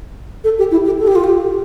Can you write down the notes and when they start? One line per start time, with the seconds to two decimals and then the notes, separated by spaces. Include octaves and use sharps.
0.44 A4
0.59 G4
0.71 E4
0.85 G4
0.99 A4
1.07 G4
1.16 F4
1.24 G4